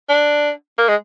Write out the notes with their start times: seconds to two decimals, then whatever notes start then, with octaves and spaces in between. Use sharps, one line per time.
0.09 D4
0.78 A#3
0.88 G#3